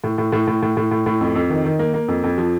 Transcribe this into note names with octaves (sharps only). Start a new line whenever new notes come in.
A2
A2
A2
A2
A2
A2
A2
A2
F2
F2
D#3
D#3
A#3
A#3
F2
F2
F3